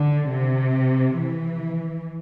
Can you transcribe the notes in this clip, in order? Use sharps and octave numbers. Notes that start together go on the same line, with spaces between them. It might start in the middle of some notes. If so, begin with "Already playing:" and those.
Already playing: D3
C3
E3